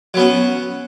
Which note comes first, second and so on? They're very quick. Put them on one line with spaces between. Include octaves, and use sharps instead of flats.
F#3 B3 C#4